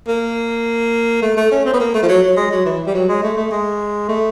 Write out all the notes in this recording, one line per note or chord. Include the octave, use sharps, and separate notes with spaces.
A#3
A3
A3
C#4
C4
B3
A#3
A3
F3
F#3
F#3
G#3
F#3
E3
G3
F#3
G#3
A3
A3
G#3
A3